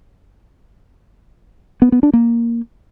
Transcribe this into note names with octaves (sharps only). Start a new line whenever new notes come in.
B3
B3
D4
A#3